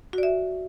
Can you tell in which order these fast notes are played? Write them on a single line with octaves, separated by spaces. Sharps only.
F#4 D5 E5